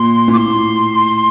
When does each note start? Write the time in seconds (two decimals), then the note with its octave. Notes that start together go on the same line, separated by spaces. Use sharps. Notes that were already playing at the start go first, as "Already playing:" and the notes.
Already playing: A#2 C6
0.28 A#2
0.33 A2 C6 D6